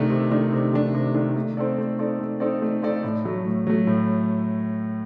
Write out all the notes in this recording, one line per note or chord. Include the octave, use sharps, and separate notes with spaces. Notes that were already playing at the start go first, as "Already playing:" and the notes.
Already playing: C3 D#3 A3 D4
C3
D#3 A3 D4
C3
D#3 A3 D4
C3
D#3 A3 D4
A3
C4 D#4 A4 D5
A3
C4 D#4 A4 D5
A3
C4 D#4 A4 D5
A3
C4 D#4 A4 D5
A2
F#3 A3
A2
F#3 A3
A2